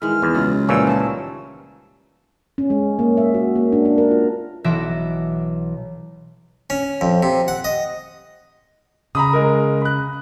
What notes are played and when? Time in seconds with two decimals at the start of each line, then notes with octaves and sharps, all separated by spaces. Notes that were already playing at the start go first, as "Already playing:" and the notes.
0.02 D#3 E3 G#3 F6
0.22 E2
0.34 C#2 F#3 F4
0.69 A#2 E3 F3 G3 A#3 C#4 E6
0.87 D#3 A5
2.58 C#4
2.70 G#3
2.99 A#3
3.17 E5
3.34 F#4
3.56 A#3
3.72 D4
3.85 D4
3.98 A#4
4.11 F4
4.64 B1 E3 E5 F#5 A#6 D7
6.70 C#4
7.01 F2
7.23 C3
7.48 F#5
7.64 D#5
9.15 C#3 A#5 B5 D#6
9.33 G#3 A#4
9.82 B5 F#6